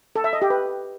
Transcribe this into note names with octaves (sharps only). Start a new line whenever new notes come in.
A4
E5
D#5
G4
B4